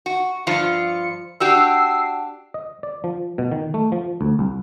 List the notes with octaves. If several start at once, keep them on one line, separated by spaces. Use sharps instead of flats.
F#4
G2 F3 F4 C#7
D4 F#4 G4 E6 C7
D#5
D5
F3
B2
D#3
A3
F3
D2
C2